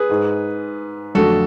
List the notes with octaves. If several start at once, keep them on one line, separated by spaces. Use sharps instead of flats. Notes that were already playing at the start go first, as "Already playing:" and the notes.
Already playing: G#4 B4
G#2 G#3
F2 D3 F#3 A3 F#4 A4